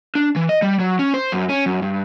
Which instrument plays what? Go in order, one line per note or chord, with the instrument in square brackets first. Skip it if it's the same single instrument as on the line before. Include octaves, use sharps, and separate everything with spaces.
[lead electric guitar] D4
E3
D#5
G3
F#3
C#4
C5
F#2
C#4
F#2
G2